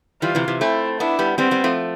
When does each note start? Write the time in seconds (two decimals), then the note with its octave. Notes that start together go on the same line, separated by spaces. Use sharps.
0.22 E3 G3 F4
0.35 C3 E3
0.48 C3 E3
0.61 A3 C4 E4
1.00 B3 D4 E4
1.19 G3 B3
1.38 G3 B3 C4
1.51 G3 B3
1.64 F3 A3